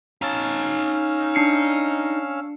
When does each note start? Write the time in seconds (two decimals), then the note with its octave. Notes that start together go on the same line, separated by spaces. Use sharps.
0.22 C#4 D#4 F5 A5 E6
1.35 D4 C7 C#7